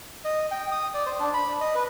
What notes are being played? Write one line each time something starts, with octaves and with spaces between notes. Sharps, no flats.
D#5
G5
D#6
D5
C5
D4
B5
D#5
B4